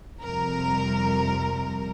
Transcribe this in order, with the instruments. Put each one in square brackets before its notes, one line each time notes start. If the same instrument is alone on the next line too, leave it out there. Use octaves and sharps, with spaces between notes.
[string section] F2 C3 G3 A#4